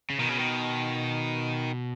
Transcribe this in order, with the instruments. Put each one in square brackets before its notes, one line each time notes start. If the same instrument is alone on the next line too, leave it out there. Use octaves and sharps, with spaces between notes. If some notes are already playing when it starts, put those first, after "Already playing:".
[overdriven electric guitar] C#3
[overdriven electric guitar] B2 [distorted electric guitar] D#3
[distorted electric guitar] C#3
D#3